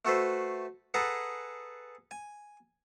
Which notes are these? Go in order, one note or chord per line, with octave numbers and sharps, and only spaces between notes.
A3 F#4 A4 B4 C5
G#4 A4 B4 F#5 A5 A#5
G#5